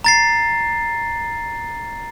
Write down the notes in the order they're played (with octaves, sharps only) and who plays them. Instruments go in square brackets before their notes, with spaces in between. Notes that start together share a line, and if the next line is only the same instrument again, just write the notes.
[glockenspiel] A#5 A6 C7